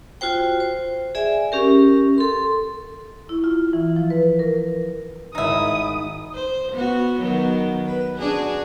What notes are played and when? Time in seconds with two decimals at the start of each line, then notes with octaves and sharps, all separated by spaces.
0.21 F4 F#4 C5 G5
0.60 C5
1.15 G#4 D5 E5 G#5
1.52 C#4 G4 A#4
2.18 A4 C6
3.29 E4
3.44 F4
3.73 E3
3.96 F3
4.10 B4
4.39 A#4
5.35 G#1 D#4 E4 D#5 D#6
6.34 C5
6.73 B3 F#4
7.20 D#3 F#3 B3
7.86 B4
8.18 D4 F#4 G#4